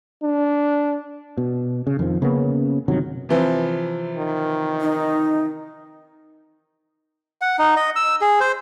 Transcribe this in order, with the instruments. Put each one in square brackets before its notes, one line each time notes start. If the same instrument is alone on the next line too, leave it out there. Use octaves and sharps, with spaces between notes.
[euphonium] D4
[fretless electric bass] B2
C#3
F2 D#3 F3
C#3 A#3 B3 C#4
G1 C3 D#3 F#3
[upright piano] C3 E3 F3
[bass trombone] D#3
[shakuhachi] D#4
[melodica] F#5
D#4
D#5
E6
G#4
C5